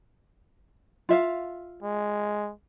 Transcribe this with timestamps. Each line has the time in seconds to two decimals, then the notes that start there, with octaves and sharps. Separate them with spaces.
1.09 F4 E5 F5
1.83 G#3